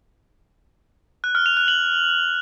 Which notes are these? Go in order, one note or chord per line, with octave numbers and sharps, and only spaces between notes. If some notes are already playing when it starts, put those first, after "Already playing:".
F#6
F6
F7
F#6
F#7